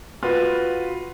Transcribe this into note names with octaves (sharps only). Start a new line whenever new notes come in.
F4 F#4 B4